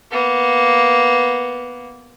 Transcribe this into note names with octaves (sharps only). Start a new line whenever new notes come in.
A#3 B3